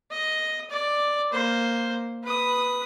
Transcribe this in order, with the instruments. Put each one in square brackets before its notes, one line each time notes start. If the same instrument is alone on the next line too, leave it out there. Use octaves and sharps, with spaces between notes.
[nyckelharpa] D#5
D5
A#3 C5
B4 D#6